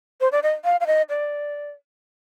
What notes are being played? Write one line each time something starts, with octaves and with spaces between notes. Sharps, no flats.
C5
D5
D#5
F5
F5
D#5
D5